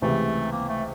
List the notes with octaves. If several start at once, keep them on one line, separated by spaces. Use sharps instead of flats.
C#2 C3 E3 A3
A#3
A3